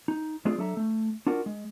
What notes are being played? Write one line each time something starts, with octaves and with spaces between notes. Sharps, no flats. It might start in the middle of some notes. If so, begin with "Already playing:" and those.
D#4
G#3 A3 C4 D4 F4 G#4
F#3 D4 A4 E5 A#5
A3
D4 F4 F#4 A#4
G#3